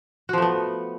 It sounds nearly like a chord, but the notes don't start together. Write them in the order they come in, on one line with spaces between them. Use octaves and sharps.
F#4 F3 A3 B3